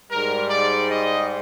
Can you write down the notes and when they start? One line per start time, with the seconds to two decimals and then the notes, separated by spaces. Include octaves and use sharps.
0.11 G#2 G3 A#4
0.50 D5
0.89 D#5